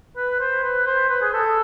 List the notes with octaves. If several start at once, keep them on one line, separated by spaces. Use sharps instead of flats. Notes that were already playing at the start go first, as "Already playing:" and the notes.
B4
C5
B4
C5
B4
G#4
A4